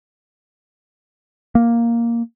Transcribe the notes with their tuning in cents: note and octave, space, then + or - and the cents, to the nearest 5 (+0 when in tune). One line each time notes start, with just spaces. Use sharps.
A#3 +0